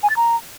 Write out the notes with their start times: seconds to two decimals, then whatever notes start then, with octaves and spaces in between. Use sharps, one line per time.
0.03 G#5
0.10 A6
0.17 A#5